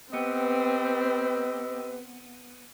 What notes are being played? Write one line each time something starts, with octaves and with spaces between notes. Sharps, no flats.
B3 C4 G4 A4 B4 D#5